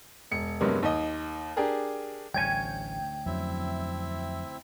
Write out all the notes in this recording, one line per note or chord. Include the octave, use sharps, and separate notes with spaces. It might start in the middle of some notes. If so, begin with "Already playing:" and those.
E1 C#7
G2 C3 F#3 G#3 A#3 B3
D#2 D#5
D4 G4 G#4 A#4
A1 D2 G3 C#5 G5 G#5
F2 F#3 C4 C#4 E4 E5